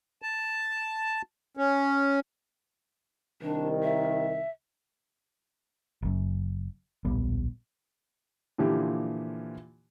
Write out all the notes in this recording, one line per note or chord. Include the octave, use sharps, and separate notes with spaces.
A5
C#4
C2 D#3 D4
E5
F#1 F#2
D1 A#1 G3 B3
A#2 D3 E3 F3 F4 G4